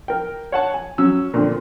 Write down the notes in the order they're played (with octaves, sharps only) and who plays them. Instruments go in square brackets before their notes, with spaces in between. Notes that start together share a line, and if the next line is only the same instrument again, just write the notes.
[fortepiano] A#4 G5
C#5 F#5 A5
G#5
F#3 C#4 E6
A#2 D3 C4